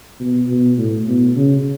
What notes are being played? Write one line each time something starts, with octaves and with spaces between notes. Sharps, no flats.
B2
B2
A2
B2
C#3